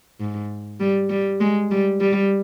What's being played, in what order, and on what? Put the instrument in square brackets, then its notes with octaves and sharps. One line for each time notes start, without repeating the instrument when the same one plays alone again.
[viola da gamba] G#2
G3
G3
G#3
G3
G3